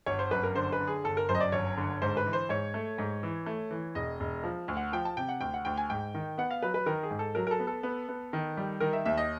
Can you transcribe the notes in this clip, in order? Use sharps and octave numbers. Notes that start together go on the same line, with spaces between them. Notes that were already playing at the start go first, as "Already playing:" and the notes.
G1 C#5
C5
F#2 B4
A#4
D3 C5
B4
D3
G#4
G1 A4
A#4
F#2 C5
D#5
D5
G1 C#5
D3
G#2 C5
B4
E3
C5
G#2 C#5
A3
G#2
E3
A3
E3
E1 D#5
E1
F3
D2
F#5
F3 G5
A5
C3 G5
F#5
D2 G5
F#5
D2 G5
G#5
G#2 G5
D#3
B3 F#5
F5
F#3 B4
B4
D#3 A#4
G#4
G#2
A4
F#3 A#4
A#4
A4
B3
A4
B3
B3
D#3
G3
D#3 A#4
E5
D#2 E5
D#5